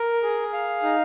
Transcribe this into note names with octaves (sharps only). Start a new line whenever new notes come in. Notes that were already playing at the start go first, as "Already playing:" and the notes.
Already playing: A#4
G#4
F5
D#4